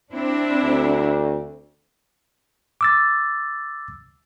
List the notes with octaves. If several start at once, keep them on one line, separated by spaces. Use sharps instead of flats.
C4 D4 E4
D2
D6 E6 A6